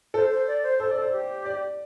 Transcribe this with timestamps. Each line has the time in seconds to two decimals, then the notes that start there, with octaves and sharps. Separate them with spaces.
0.14 A4 C5
0.31 C5
0.47 D5
0.63 C5
0.79 A4 C5
0.91 D5
0.96 A4
1.02 C5
1.12 G4
1.45 D5